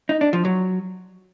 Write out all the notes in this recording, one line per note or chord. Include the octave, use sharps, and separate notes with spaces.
D#4
D4
F3
F#3